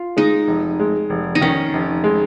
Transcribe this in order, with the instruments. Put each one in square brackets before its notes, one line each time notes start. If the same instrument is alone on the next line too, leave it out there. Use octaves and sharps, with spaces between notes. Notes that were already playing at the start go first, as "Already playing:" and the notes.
Already playing: [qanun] F4
[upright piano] G#3 [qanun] D#4
[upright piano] F1
G#3
F1
[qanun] D#4
[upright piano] D#3 [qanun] C#4
[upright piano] F1
G#3